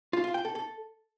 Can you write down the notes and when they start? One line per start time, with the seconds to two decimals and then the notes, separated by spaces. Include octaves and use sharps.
0.13 F4
0.24 F4
0.34 G5
0.45 A4
0.55 A4